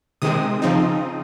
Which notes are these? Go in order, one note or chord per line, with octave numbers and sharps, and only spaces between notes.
C3 D#3 G#3 C4 D#6
C#3 F3 C4 D#4